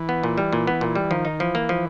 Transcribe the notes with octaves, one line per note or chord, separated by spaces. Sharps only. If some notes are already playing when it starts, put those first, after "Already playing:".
Already playing: E3
B3
A#2
G3
A#2
B3
A#2
G3
D#3 F3
D#4
E3 F3
A#3
F3